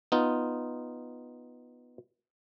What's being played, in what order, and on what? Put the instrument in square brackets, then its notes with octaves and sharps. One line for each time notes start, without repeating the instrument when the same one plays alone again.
[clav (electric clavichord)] B3 D#4 F4